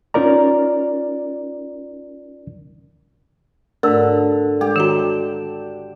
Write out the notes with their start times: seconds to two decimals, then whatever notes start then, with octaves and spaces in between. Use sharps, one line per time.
0.14 C#4 D#4 F4 A#4 D5 A#5
3.83 G#2 D3 A3 A#4 E6
4.61 G#3 G4
4.76 D#3 F#4 D#5 A#5 E7